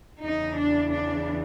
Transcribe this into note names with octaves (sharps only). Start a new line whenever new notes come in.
E2 C#3 E3 D#4
D4
D4